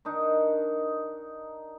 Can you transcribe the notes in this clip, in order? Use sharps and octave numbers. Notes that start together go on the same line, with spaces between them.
D#3 D4 D#4